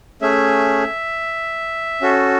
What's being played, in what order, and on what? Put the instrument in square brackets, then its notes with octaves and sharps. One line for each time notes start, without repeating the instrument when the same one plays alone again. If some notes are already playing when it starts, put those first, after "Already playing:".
[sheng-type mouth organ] A3 C#4 G#4 E5
C#4 F#4 A4